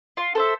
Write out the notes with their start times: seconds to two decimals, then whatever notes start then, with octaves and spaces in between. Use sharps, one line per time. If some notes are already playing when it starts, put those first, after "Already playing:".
0.17 F4
0.35 A4 C5 E5